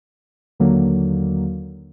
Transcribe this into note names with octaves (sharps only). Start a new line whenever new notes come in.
D#2 D3 F#3 A#3